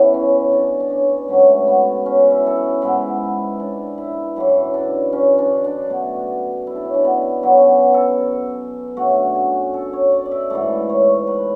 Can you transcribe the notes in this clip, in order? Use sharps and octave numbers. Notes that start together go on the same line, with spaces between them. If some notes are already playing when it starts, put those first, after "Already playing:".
Already playing: C#3 E3 B3
C#4
D4
D4
C#4
G#2 F#3 A3 C#4
B3
C#4
E4
A4
G#4
G#2 G#3 B3 E4
D4
E4
F#2 C#3 E3 E4
D4
C#4
D4
D4
B2 A3
E4
D4
C#4
D4
B3
B2 F#3 B3 C#4
G#4
A4
F#2 D3 A3 F#4
G#4
A4
C#5
D5
D5
E5
G#2 E3 A3 D5
C#5
B4